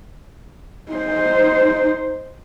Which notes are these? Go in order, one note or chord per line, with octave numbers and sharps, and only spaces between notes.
D#4 C5